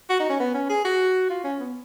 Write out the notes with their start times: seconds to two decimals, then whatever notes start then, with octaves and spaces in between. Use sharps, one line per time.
0.10 F#4
0.20 D#4
0.29 C#4
0.40 B3
0.54 C#4
0.69 G#4
0.85 F#4
1.30 F4
1.44 C#4
1.60 B3